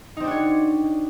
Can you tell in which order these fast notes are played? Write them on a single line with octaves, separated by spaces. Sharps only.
D#4 C4 D4 F#4 C#5